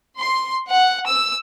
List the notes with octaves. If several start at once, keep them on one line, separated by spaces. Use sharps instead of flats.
C6
F#5
E6